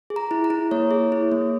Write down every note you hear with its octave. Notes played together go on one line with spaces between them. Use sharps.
G#4
A#5
E4
A#5
E4
A#3 C#5
G#4
E4
A#3